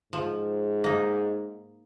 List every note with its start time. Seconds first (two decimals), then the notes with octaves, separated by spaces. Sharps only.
0.13 G#2 F3
0.84 A#3 D#4